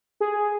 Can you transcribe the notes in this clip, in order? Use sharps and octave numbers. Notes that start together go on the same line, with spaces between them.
G#4